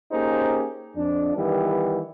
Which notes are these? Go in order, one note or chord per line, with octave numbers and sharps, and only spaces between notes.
A#3 C#4 D#4 G4 G#4 C5
F2 D4
D#3 E3 G3 B3 G4